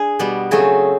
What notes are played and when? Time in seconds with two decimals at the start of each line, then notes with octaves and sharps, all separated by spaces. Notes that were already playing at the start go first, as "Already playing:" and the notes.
Already playing: D4 G#4
0.19 B2 G3 B3
0.51 C#3 F#3 A3 C4 G#4